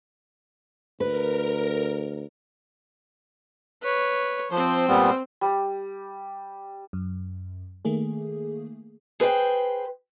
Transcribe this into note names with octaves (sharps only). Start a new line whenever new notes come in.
D2 A#4 B4
B4 C#5
F3 C4 C5
A#2 G3 B3
G3
F#2
D#3 A3 A#3 G#4
G#4 B4 C5 G5